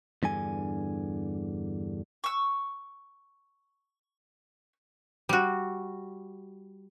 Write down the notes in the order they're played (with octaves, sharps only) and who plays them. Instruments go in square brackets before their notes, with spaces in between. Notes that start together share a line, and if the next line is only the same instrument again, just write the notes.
[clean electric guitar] E2 G2 D3 G#5
[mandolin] C#6 E6
[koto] G3 F#4